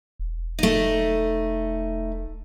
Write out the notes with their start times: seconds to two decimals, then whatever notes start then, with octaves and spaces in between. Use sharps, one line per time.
0.19 E1
0.59 A3 D#4